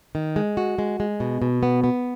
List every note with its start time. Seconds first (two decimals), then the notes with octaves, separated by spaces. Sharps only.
0.15 D#3
0.36 G#3
0.57 F#4
0.79 G#3
1.00 G#3
1.20 B2
1.42 B2
1.63 B3
1.84 B3